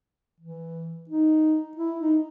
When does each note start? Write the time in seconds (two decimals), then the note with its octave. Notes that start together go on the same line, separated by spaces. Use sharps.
0.40 E3
1.09 D#4
1.77 E4
2.00 D#4